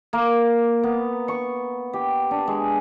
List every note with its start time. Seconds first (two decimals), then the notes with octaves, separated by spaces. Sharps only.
0.13 A#3
0.83 B3
1.28 C#6
1.93 G4
2.31 D4
2.47 G#3